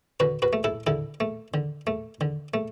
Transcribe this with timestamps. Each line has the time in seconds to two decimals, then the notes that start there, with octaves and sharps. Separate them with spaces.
0.20 D3 F#4 B4
0.42 F#4 B4
0.53 A3
0.64 E4 A4
0.87 D3 E4 A4
1.20 A3
1.54 D3
1.87 A3
2.21 D3
2.54 A3